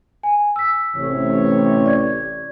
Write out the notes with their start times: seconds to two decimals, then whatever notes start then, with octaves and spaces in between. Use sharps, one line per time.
0.23 G#5
0.56 E6 B6
0.96 A1 C3 C#5
1.86 D5 G#6